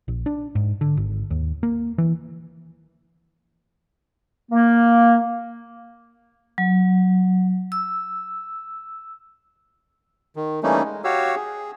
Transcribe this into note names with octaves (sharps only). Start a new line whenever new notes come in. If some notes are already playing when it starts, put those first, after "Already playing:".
A#1
D4
G#2
D3
G#1
D#2
A#3
E3
A#3
F#3
E6
D#3
E3 G3 A3 A#3 C#4 D#4
G#3
F#4 G4 C#5 F5 E6
G#4